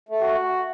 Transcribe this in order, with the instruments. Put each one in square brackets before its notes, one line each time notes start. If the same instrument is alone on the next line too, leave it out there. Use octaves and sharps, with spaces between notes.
[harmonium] A3
[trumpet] F#4